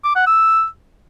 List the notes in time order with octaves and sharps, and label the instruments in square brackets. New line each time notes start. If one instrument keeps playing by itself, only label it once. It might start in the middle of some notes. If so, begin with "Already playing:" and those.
[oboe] D6
F#5
E6